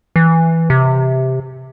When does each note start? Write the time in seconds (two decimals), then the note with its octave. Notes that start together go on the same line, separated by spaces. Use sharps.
0.16 E3
0.70 C3